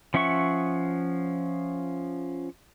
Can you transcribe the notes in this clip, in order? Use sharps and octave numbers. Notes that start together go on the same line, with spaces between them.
F3 C#4 E5 F#5 C#6